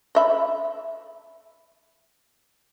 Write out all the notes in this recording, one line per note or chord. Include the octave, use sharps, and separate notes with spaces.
D#5 E5 B5